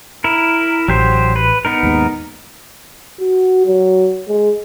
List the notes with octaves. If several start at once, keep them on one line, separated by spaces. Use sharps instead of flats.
E4 A#4
A1 F#3 G4 C5
B4
B3 D#4 A#4
D#2 G#2
F#4
F#3
G#3